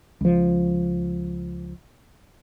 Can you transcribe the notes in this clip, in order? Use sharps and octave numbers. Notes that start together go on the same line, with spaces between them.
C#2 F3